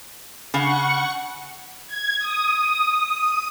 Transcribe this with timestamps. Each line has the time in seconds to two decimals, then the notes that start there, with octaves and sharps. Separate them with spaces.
0.54 C#3 F#5 C#6
1.87 G#6
2.19 D#6